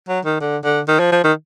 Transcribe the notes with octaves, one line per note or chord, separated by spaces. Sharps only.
F#3
D#3
D3
D3
D#3
F3
F3
D#3